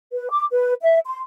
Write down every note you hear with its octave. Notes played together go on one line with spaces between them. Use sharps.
B4
D6
B4
E5
C6